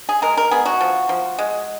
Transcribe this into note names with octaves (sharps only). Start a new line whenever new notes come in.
G#4
G#3 A#4
A#4
B3 G#4
F#4
F3
F3
G#3